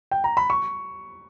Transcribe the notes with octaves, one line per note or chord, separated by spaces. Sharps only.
G5
A#5
B5
C#6